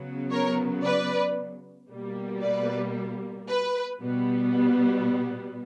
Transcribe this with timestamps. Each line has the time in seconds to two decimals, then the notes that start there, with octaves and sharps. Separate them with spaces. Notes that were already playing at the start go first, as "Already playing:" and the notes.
Already playing: C#3 F#3 B3
0.31 A#4 C#5
0.84 B4 D5
1.90 B2 G3 A#3
2.42 B4 D5
3.48 B4
4.01 B2 G3 B3